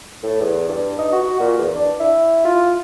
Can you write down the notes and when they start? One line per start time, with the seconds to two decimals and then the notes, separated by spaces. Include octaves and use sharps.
0.23 A2
0.41 E2
0.69 G2
0.99 D#4
1.13 F#4
1.40 A#2
1.58 E2
1.75 D4
2.00 E4
2.45 F4